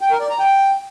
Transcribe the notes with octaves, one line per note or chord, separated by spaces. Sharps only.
G5
A#4
D5
A#5
G5